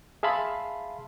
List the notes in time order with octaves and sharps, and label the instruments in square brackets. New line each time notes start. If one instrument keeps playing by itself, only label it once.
[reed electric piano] G#4 E5 F5 A5 B5 C6